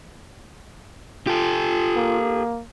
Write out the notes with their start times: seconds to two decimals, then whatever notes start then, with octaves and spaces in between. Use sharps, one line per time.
1.27 F4 G4 A4
1.96 A#3